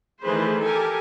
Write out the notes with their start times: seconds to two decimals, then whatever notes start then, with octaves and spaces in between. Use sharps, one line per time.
0.21 D#3 E3 A3 G#4 B4 C5
0.63 G4 A4 A#4 G#5